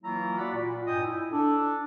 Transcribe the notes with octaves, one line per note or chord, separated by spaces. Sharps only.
E3 F#3 A#3 E4 F4 A#5
F4 F#4 D5 F#5 B5
A#2
G2 A#2 D#5 G5 G#5 D#6
E4
D4 A4